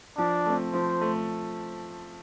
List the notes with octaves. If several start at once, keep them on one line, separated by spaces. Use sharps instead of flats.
F3 D4
A3 C4
F3 C5
A3